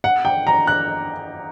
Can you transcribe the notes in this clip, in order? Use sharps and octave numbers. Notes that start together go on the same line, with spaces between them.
F#5
G5
A#5
F#6